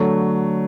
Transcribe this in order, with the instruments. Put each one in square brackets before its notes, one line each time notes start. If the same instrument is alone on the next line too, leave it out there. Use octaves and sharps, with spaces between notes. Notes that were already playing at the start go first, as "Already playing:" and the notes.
Already playing: [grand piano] D3 F#3 A3